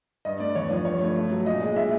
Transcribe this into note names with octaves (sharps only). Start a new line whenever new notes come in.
G2 D#5
A3 D5
E2 C#5
F3
G2 C#5
A3
A3
F#3
A#2 D#5
G#3
A#2 E5